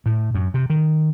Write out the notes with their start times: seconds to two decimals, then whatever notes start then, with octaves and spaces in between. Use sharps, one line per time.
0.06 A2
0.35 F#2
0.54 C3
0.70 D#3